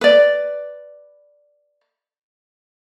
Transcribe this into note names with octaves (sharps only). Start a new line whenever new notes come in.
B4 D5